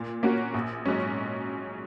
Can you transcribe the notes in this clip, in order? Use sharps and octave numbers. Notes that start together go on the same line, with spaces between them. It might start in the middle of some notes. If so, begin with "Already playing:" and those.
Already playing: A#2
A#3 C#4 F#4
A#1
G#2 F#3 C#4